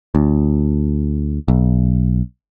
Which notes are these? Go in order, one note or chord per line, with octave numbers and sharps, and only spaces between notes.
D2
B1